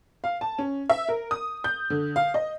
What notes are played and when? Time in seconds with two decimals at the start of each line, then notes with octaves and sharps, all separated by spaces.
0.24 F5
0.41 A5
0.59 C#4
0.90 E5
1.09 A#4
1.31 D#6
1.64 G6
1.90 D3
2.16 F5
2.34 D#5